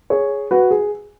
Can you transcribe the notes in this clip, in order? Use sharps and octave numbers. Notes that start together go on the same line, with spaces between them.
G#4 C#5
F#4 B4
G#4